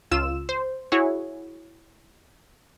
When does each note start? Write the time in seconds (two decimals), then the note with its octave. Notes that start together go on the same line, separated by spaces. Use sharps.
0.11 C#2 F4 E6 E7
0.49 C5
0.92 E4 F#4 G#4 C#5